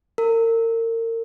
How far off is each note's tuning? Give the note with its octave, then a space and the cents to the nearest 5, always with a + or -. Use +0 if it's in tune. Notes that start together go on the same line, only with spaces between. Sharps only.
A#4 -35